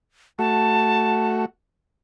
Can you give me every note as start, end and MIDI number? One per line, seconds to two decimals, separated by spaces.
0.39 1.46 57
0.39 1.46 66
0.39 1.42 81